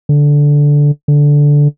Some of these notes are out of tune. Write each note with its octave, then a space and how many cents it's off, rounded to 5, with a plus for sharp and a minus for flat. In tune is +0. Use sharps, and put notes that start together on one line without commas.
D3 -10
D3 -10